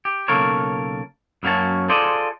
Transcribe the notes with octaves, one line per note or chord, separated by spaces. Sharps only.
G4
B1 C#3 A#3 A4 A#4 C#5
F#2 F#3 A#3 C#4 C#5 A5
F4 G#4 A4 C5 D5 D#5